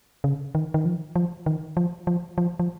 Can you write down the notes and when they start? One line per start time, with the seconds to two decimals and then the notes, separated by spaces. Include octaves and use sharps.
0.24 C#3
0.55 D#3
0.74 D#3
0.85 F3
1.16 F3
1.46 D#3
1.77 F3
2.07 F3
2.38 F3
2.59 F3